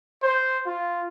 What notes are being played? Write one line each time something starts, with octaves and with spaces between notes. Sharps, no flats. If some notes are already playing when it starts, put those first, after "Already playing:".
C5
F4